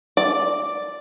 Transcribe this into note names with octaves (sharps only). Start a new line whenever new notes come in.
D5